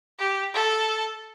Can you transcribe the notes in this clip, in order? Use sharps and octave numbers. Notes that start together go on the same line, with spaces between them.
G4
A4